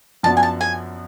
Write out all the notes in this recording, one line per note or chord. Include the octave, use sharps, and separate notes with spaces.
F#2 F3 B3 D4 F#4 A5
G#5
A5
G#5